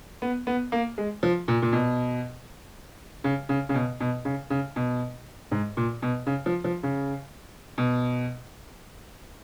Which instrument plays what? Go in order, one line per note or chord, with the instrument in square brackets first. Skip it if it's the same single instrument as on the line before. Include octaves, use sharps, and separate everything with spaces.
[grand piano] B3
B3
A#3
G#3
F3
A#2
A#2
B2
C#3
C#3
C#3
B2
B2
C#3
C#3
B2
G#2
A#2
B2
C#3
F3
F3
C#3
B2